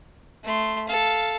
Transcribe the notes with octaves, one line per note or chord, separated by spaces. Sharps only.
A3 C6
A4 F5